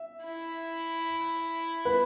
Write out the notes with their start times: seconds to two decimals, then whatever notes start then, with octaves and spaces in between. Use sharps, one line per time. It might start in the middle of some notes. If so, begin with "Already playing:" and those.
Already playing: E5
0.23 E4
1.85 B4